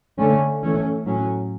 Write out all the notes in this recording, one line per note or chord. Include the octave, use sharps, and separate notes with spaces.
D3 A3 C#4
E3 A3 C#4
A2 F#3 C#4